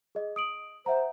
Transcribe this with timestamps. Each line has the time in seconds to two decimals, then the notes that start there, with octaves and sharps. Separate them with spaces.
0.15 G#4 D#5
0.36 D#6 D7 F#7
0.86 C5 E5 F#5 A#5